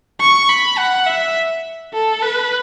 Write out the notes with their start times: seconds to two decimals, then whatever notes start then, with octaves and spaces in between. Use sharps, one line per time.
0.20 C#6
0.49 B5
0.78 F#5
1.07 E5
1.94 A4
2.23 B4